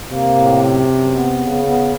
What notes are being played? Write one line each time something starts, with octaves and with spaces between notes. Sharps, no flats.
C3 A#3
A2
F#2
F#2
B3
C#3
B3